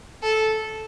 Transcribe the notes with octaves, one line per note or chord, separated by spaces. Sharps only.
A4